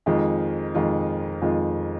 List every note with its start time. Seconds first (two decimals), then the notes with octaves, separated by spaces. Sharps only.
0.06 F2 D#3 G#3 F4
0.75 F2 D#3 G#3 F4
1.42 F2 D#3 G#3 F4